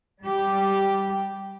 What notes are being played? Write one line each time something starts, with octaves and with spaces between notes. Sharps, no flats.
G3 G4